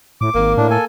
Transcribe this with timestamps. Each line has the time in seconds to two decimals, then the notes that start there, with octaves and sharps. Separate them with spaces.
0.21 A2 D6
0.35 G#1 A#3
0.57 A2 D4
0.71 A4 G#5